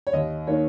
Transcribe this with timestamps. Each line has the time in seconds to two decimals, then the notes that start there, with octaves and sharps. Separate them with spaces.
0.07 C#5
0.13 D#2 D#5
0.47 D#3 A#3 C#5